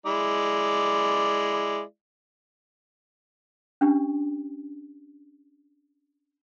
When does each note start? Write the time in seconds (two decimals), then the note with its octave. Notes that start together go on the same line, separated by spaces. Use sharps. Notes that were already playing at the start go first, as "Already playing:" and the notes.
0.06 G#3 E4 D5
3.81 C#4 D4 G4